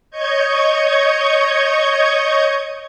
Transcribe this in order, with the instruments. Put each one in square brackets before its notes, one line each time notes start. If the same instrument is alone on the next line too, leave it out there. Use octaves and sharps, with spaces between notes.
[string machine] C#5 D#5 C#6 G6 G#6